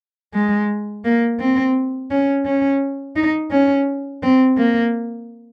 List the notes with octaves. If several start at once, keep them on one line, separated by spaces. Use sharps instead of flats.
G#3
A#3
C4
C#4
C#4
D#4
C#4
C4
A#3